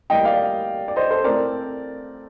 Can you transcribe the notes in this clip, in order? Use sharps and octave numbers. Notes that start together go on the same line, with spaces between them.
A2 G3 A#3 D#5 G5
D5 F5
D5
C5 D#5
A4 C5
A2 A3 C4 A#4 D5